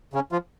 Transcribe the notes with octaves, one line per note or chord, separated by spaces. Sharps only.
C#3 C#4
F3 F4